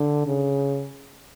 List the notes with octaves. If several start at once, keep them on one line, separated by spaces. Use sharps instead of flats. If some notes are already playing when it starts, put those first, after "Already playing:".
Already playing: D3
C#3